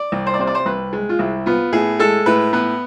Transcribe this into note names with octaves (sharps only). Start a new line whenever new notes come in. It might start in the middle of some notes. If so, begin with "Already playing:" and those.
Already playing: D5
C2
C5
D5
C3 C5
D5
C5
C2 B4
G#3
F4
C2 E4
B3 F4
A2 G#4
G#3 A4
A2 B4
B3 B4